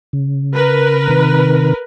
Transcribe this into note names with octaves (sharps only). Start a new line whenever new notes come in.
C#3
A#4 B4
C3 D#3